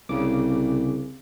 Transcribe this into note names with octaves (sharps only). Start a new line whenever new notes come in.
C2 C#3 D6